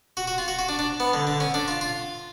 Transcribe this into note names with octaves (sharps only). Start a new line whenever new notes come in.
F#4
F#4
F4
F#4
F#4
D4
D4
B3
D3
D3
C#4
D4
F4
F4